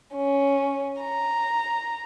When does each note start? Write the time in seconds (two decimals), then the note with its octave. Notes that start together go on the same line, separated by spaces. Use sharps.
0.15 C#4
1.02 A#5